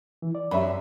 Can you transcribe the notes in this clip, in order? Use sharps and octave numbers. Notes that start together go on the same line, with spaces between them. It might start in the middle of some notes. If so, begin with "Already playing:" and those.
E3
D5
F#2 E5 B5